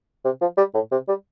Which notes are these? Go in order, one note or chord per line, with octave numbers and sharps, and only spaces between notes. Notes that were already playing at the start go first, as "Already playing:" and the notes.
C3
F3
G3
A2
C3
G3